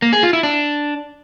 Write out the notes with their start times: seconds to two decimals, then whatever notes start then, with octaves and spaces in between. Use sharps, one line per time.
0.02 A#3
0.13 G#4
0.23 F4
0.33 E4
0.43 D4